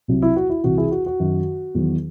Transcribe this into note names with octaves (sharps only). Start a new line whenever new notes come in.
C2 C3 F#3
E4
F#4
E4
C2 C3 E3 F#4
E4 G#4
F#4
F#4
F#2 D#3 F#3
E2 D#3 F#3